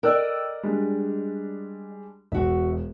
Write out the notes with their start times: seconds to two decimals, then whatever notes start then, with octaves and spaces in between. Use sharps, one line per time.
0.03 A#4 D5 D#5 G5 E6 F#6
0.63 G3 G#3 D4
2.32 E1 F#4 E5